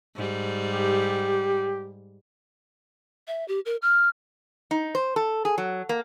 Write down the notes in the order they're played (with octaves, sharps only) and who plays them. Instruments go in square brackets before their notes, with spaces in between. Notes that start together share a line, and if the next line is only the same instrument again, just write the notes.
[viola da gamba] G#2 G3
[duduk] G4
[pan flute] E5
G4
A#4
F6
[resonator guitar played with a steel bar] D#4
C5
A4
G#4
F#3
A#3